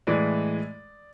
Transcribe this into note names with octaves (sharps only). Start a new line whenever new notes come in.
A2 E3 G#3 D5